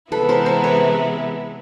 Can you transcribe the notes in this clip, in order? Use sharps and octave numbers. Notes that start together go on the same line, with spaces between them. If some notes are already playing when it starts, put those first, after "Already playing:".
C3 E3 G#3 B3 E4 A4 B4
A#4 C5
A#4 C5
B4 C#5